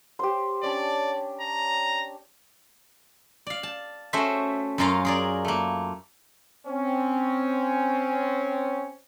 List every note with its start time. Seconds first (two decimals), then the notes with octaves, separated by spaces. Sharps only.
0.19 G4 C5 C6
0.63 C#4 D4 D5
1.41 A#5
3.47 D5 F5
3.63 A5
4.13 A3 C#4 F#4 C5 E5
4.78 F#2 C#4 F4 A#4 F5
5.05 G#4 A#4 D5
5.45 A3 A#3
6.67 C4 C#4